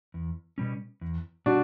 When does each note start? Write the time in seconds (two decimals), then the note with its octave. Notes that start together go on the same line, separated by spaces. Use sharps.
0.14 E2
0.58 B2 G3 C#4
1.01 E2
1.46 B2 G3 D4 F#4